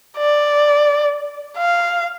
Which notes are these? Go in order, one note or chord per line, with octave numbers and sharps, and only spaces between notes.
D5
F5